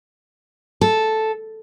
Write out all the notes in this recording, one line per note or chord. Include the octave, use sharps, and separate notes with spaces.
A4